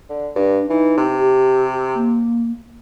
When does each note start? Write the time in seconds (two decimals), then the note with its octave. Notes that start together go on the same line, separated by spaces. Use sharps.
0.09 D3
0.36 G2 D4
0.70 E3 D#4
0.97 C3
1.19 G4
1.95 A#3